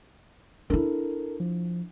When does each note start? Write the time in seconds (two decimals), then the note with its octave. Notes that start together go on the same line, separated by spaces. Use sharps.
0.70 D4 E4 A4 A#4
1.40 F3